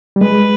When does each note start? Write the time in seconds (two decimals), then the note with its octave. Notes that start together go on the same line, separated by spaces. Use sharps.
0.16 G3
0.21 G#3 B4